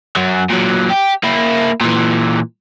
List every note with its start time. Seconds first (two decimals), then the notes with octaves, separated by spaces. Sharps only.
0.16 F#2 F#3
0.49 A#2 F#3
0.90 G4
1.24 A#3 E4
1.81 A#2 E3